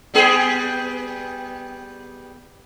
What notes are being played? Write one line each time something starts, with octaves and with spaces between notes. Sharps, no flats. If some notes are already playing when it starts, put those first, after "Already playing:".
G3 B3 G#4